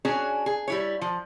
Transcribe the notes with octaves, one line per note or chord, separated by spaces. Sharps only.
C#4 D4 F#4 G#4 C#5
G#4
G3 E4 C#5
F3